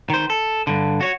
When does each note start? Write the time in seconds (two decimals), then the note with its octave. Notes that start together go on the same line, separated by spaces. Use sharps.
0.10 D#3 C5
0.30 A4
0.67 G2 D3
1.01 F#4 C#5